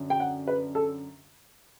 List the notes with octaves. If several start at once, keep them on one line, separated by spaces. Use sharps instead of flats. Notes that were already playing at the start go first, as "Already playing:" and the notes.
Already playing: F#2 D3
G5
F#5
B4
A4